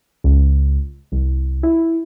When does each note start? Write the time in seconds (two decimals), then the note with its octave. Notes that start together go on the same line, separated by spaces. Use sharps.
0.24 C#2
1.12 C2
1.63 E4